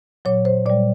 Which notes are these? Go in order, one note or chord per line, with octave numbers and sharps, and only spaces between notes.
A#2 F#3 C#5
C5
A#2 G3 D5